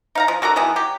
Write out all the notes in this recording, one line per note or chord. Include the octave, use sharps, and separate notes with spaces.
D#4 F5 A#5
F3
D3 F#4 A#4 A#5
D#3 E3 G#3 B3
F#3 G4